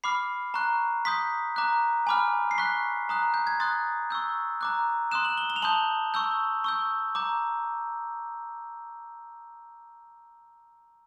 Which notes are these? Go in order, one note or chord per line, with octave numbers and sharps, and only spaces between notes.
B5 D6 F6 C7
A#5 C#6 F#6
C6 D#6 G6 B6
A#5 D6 F#6
G#5 B5 D6 F6
C7
C#6 F#6 B6
A#5 D#6 F#6
G6
G#6
C6 D#6 F#6 A6
C#6 E6 G6
A#5 D6 F#6
C6 D#6 F#6 E7
F#7
G7
G7
F7
A5 C6 D#6 G6 F#7
C#6 E6 G6
C#6 E6 G6
A#5 D6 G6